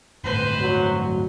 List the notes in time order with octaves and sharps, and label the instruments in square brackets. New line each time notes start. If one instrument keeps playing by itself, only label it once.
[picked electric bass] G1 A2 [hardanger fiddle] B4 C5
[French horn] F#3